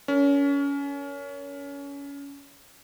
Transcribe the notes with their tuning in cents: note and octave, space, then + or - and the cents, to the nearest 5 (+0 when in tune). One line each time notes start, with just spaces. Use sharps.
C#4 +25 A#4 +0